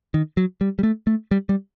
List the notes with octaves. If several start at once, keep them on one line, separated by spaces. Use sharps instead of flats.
D#3
F#3
G3
G3
A3
A3
G3
G3